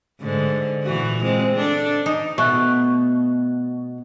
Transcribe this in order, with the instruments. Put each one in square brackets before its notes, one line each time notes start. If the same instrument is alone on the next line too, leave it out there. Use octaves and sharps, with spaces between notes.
[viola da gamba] G#2 D3
A#2 E3 F#4
G#3 C4
D4 A4
[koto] D#4
[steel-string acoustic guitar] B2 [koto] A3 [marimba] C#6 F#6